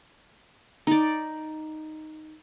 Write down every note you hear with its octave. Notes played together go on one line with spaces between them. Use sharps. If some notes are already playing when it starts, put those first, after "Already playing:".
D#4 D5